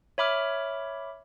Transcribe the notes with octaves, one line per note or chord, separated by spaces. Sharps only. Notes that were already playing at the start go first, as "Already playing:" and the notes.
C#5 E5 B5 D6 F6